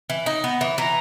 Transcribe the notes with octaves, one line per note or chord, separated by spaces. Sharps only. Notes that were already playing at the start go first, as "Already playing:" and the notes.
E3
D#4
B3
E3
E3 A#5